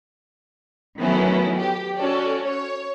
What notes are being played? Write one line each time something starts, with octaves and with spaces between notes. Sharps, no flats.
D#3 F#3 A3 B3 C#4 E4
G4
C#4 F#4 A4 C#5 D5
C#5